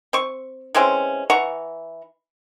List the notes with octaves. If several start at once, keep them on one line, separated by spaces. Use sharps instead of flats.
C4 C#6
E3 G#3 C4 C#4
E3 F#5 A#5 C#6